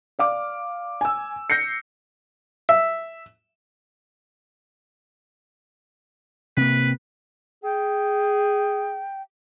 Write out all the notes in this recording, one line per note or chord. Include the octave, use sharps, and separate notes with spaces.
D5 F5 D6
G#5 E6
G6 A#6 C7 C#7
E5
C3 A#3 B4
G#4 G5